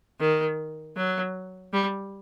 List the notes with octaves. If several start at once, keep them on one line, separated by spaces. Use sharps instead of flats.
D#3
F#3
G3